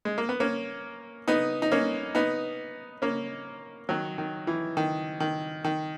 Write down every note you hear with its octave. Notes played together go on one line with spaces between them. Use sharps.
G#3
A#3
B3
A#3 C#4
B3 D#4
D#4
A#3 C#4
B3 D#4
A#3 C#4
D#3 F#3
D#3
E3
D#3
D#3
D#3